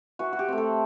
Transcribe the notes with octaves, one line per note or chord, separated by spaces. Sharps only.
E3 F#4
F#4
G4
A3 C4
A4